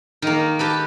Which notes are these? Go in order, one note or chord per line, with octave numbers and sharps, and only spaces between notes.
D#3 A#3
G4 A4 B4